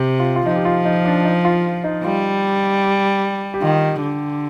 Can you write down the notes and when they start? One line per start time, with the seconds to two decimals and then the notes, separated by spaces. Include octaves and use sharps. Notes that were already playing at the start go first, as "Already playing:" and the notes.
Already playing: C3 G4
0.20 F4
0.36 F4
0.46 F3 D#4
0.56 G4
0.65 F4
0.85 D#4
1.05 D4
1.25 D#4
1.45 F4
1.84 D#4
2.04 G3 F4
3.54 G4
3.62 D#3 F4
4.02 D3